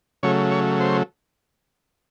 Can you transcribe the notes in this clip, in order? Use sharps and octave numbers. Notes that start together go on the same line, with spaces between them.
C#3 F#3 A3 C#5
C#5
C5